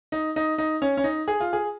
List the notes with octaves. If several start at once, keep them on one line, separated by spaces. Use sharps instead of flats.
D#4
D#4
D#4
C#4
C#4
D#4
G#4
F4
G#4